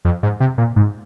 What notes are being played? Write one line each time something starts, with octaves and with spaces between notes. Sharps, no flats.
F2
G#2
C3
A#2
G#2